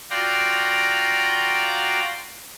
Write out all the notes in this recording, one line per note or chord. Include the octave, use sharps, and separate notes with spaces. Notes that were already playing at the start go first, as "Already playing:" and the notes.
F4 F#4 D5 G5 A#5 C6